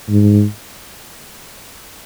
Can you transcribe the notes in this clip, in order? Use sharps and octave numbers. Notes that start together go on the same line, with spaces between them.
G#2